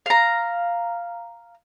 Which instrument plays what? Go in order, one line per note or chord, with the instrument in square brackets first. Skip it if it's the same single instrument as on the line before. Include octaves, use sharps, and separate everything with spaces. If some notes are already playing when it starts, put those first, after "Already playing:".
[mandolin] F5 A#5